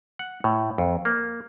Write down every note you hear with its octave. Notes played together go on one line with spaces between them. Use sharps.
F#5
A2
F2
A#3